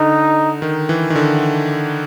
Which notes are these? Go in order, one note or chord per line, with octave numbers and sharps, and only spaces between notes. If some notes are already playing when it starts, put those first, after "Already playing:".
Already playing: D3 D#4
D#3
E3
D#3
D3